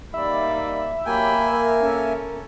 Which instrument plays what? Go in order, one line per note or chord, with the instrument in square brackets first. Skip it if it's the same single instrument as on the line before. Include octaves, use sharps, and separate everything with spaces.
[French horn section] G3 A#3 D#4 [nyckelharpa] D5 B5 [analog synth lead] E5
[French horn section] F#3 G4 [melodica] A#3 G#5 [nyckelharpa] G5 B5
[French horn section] A#4
[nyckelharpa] C#4 A4